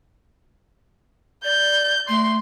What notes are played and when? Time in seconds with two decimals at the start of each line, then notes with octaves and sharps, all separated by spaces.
1.44 D5 G6
2.09 A3 C6